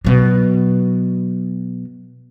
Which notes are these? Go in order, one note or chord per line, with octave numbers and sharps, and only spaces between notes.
B2 F#3